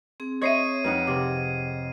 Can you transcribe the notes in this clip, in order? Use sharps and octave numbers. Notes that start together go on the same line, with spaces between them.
C4 G#4
C#5 D#5 E5 B5 C6 G#6 C7 D#7
F2 D#4 B4 F#5
C3 B4 C6 D6